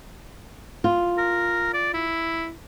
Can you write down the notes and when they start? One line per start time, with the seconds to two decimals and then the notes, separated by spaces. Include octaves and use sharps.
0.84 F4
1.18 A#4
1.74 D5
1.94 E4